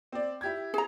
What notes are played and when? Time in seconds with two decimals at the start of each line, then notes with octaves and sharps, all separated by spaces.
0.12 C4 D5
0.41 E4 G4 G#6
0.74 G#4 A#5